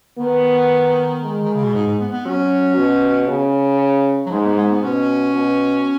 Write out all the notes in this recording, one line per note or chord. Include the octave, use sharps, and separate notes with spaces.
D#3 B3
G#3
D#3
C#3
B2
G#2
G#2
B3
B3
F#3 C#4
B2
C#3
F#3
G#2 G#3
B3
G#3
B3
B2 C#4
B2